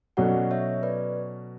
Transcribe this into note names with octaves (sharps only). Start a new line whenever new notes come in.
B2 F#3 C#4 F#4 A4 D5 F#5
C#5 E5
B4 D5